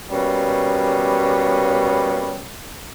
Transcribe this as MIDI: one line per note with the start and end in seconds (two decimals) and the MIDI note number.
0.10 2.48 47
0.10 2.48 55
0.10 2.48 58
0.10 2.48 61